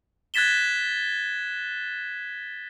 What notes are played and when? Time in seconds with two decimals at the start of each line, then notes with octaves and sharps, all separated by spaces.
0.34 F#6 G#6 A6 B6 E7 G7